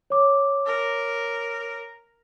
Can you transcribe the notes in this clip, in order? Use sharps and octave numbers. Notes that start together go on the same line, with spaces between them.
C#5 D6
A#4